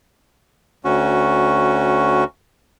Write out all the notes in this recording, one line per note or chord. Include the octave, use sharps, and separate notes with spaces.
D2 C#4 F#4